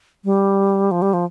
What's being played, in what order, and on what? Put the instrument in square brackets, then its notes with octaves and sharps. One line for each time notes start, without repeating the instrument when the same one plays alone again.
[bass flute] G3
F3
G3
F3